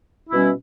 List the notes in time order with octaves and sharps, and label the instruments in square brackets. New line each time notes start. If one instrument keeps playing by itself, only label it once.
[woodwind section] B2 G3 C#4 E4